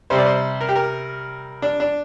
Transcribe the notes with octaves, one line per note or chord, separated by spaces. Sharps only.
C3 G3 C5
D5
C5
A#4
G4
A#4
D4
D4